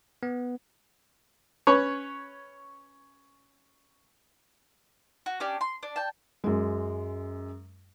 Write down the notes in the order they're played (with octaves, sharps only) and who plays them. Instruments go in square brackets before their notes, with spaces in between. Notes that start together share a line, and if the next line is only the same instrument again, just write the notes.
[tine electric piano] B3
[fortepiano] C#4 B4 C#5
[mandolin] F#4
C#4 D4 G4
C6
D4
G5 A5
[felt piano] F#2 G#3